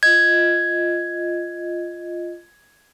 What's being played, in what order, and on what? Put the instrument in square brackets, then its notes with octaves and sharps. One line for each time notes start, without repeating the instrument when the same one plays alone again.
[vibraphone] F4 D#5 [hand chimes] G#6